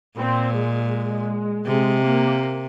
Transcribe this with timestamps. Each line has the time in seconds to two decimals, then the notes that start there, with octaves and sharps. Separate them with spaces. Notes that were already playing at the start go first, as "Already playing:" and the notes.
0.18 A#2 C4
0.55 G#3
1.66 C3 G#3
2.03 A#3